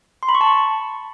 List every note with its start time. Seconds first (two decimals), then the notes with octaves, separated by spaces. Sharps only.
0.23 C6
0.29 B5
0.35 C#6
0.41 A5
0.47 C#6